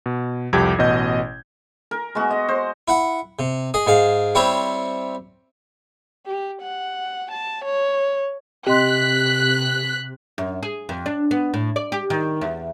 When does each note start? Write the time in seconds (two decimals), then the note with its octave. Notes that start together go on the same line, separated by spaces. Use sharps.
0.06 B2
0.53 C2 F2 G4 D6 G#6
0.78 A1 B2 D#5 G6
1.91 A#4
2.15 G#3 B3 F#4
2.31 D#5
2.49 C5
2.88 E4 F#5
3.39 C3
3.74 G#4 D#5
3.87 G#2 G#4 F5
4.35 G3 C4 E4 C#5 E5
6.26 G4
6.62 F#5
7.32 A5
7.65 C#5
8.67 C3 C4 G4 D#5 C6 F#6 B6
10.38 F#2
10.63 G#4
10.89 F2
11.06 D4
11.31 B3
11.54 A2
11.76 D5
11.92 G4
12.10 D#3
12.41 E2